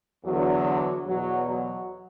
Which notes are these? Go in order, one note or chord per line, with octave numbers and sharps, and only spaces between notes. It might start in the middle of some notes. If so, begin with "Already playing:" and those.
E2 D3 F#3
E2 B2 F#3
F#3